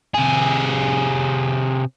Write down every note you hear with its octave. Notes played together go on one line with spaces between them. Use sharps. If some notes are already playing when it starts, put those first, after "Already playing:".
C3 G#4